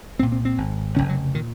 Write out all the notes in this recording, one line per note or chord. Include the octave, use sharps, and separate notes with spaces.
C2 A#2 C4
C4
C4
G#1 G#2
F1 D#2 C#3 C#4
F#3
A#2 D#3